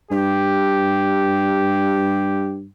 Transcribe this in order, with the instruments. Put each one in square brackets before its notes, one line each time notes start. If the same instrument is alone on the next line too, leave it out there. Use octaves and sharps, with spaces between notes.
[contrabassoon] G2 [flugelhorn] G4